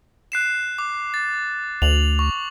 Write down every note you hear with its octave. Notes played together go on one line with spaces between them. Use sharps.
F#6 C7 E7
D6
A6
D2 F7 F#7
C#6